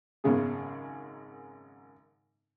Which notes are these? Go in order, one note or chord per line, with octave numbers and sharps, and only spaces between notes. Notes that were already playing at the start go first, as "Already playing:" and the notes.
G#1 F#2 C#3 G#3 C#4 G#4